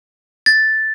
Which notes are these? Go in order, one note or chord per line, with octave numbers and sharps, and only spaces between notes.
A6